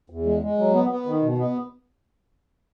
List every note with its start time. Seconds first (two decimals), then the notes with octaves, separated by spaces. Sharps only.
0.10 E2
0.26 G#3
0.42 G#3
0.58 F#3
0.74 B3
0.90 B3
1.06 D#3
1.22 B2
1.38 B3